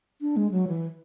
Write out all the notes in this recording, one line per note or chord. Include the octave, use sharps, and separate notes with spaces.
D4
G#3
F#3
E3